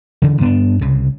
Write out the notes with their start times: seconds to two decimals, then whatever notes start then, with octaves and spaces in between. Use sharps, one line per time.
0.22 C#3 E3
0.41 G2 B3 C4 D4
0.81 C2 C#3